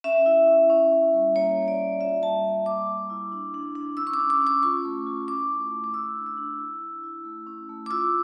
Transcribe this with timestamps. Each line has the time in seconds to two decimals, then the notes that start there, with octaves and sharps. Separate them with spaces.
0.04 C#4 E5
0.26 E4
0.48 E4
0.70 C#4
0.92 C#4
1.13 G3
1.35 A#3 C#5
1.57 A#3
1.63 C#5
1.68 D5
1.79 A#3
2.01 F4 E5
2.23 G3 A5
2.44 G3 A5
2.66 A#3 D6
2.88 A#3
3.10 E4
3.32 D4
3.54 D4
3.75 D4
3.97 C#4 E6
4.07 C#6
4.14 D6
4.19 C#4
4.30 D6
4.41 C#4
4.47 D6
4.63 F4 C#6
4.85 A3
5.07 F4
5.28 E4 D6
5.50 A3
5.72 A3
5.84 D6
5.94 A3 E6
6.16 D4
6.26 E6
6.37 D4
6.60 E4
6.81 E4
7.03 E4
7.25 A3
7.47 C#4
7.69 A3
7.86 D6
7.90 F4 E6